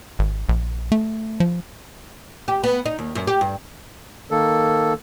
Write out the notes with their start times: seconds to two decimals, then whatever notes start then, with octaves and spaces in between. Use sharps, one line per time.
0.19 G#1
0.49 A#1
0.92 A3
1.40 F3
2.48 G4
2.63 B3
2.86 D#4
2.99 D#2
3.15 F#2
3.27 G4
3.41 G2
4.31 D#3 A#3 A4